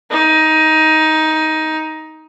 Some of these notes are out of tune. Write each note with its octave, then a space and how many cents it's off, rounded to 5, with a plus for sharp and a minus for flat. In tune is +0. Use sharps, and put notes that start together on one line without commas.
D#4 +15